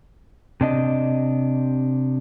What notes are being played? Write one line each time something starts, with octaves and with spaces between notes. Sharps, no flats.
C3 D4 D#5